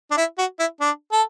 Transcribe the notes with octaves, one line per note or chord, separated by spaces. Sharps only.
D4
E4
F#4
E4
D4
A4